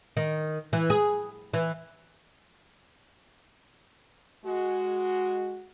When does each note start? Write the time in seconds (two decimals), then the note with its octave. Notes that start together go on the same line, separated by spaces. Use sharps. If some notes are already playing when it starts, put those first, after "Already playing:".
0.17 D#3
0.73 E3
0.90 G#4
1.54 E3
4.45 G#3 F#4